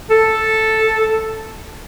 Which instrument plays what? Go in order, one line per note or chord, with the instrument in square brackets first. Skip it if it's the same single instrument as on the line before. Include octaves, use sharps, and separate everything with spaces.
[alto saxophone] A4